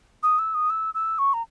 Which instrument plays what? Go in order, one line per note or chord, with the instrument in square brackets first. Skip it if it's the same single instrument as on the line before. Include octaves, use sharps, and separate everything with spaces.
[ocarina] D#6
E6
D#6
E6
E6
C#6
A#5